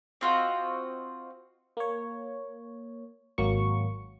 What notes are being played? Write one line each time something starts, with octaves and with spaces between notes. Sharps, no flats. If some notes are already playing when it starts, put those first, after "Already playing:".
C4 F4 F#4 D#5
A#3 C#5
G#1 F#3 A#3 C#6